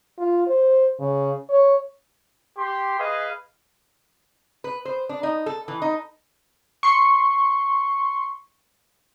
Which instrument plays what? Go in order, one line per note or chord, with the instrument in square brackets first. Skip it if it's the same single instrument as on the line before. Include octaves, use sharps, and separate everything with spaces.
[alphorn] F4
C5
C#3
C#5
[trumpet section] G4 C6
G#4 B4 D#5 F5
[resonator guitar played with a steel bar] B4
C5
D4
D#4
A4
E3
D#4
[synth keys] C6 C#6